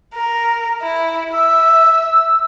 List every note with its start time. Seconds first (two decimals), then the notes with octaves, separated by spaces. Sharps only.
0.14 A#4
0.81 E4
1.34 E5 E6